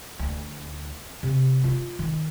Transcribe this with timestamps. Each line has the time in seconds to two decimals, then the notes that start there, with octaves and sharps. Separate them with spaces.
0.19 D2
1.23 C3
1.64 F4
1.99 D#3